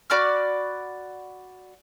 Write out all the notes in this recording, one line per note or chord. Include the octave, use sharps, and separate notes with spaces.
F#4 D5 B5 F6